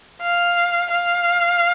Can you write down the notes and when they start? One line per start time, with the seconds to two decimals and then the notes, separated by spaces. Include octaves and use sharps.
0.22 F5
0.90 F5